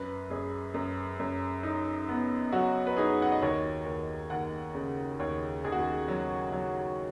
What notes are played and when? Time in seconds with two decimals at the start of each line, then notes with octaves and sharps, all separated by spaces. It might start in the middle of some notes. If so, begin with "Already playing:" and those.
Already playing: F#2 B4
0.30 F#2 G#4
0.74 F#2
1.20 F#2
1.63 D#4
2.09 B3
2.52 F#3 F#4
2.87 B4
2.97 D#4 G#4
3.22 F#5
3.32 D#5
3.42 D#2 C#5
3.86 D#2
4.30 D#2 F#5
4.75 C#3
5.20 D#2 C#5
5.64 D#2 G#4
5.72 F#4
5.79 G#4
6.08 F#3
6.52 F#3